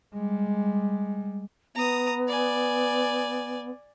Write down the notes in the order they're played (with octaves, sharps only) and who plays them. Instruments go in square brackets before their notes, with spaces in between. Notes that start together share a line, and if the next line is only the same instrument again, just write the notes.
[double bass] G3 G#3
[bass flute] B3 [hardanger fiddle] A#5 D#6
[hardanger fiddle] D5 G#5